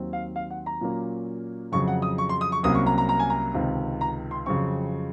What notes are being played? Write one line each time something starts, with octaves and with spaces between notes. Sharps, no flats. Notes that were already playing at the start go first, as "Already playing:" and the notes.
Already playing: D#2 D#3 F#3 C4
F5
F5
F#5
A#5
A#2 F#3 A#3 C#4
F2 C#3 F#3 C#6
F#5
D#6
C#6
C6
D#6
C#6
C2 C3 F#3 A#3 C#4 D#6
C#6
A#5
A#5
A#5
G#5
A#5
C#2 C3 D#3
A#5
C6
F2 C#3 F#3 C4 C#6